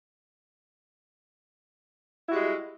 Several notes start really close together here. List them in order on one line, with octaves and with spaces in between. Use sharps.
E4 F#4 G3 G#3